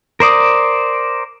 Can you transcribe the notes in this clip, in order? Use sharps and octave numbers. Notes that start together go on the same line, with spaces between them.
A#4 C5 D5 D#6